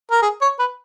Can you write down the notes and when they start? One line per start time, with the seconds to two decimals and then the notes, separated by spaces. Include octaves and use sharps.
0.11 A#4
0.22 G#4
0.41 C#5
0.59 B4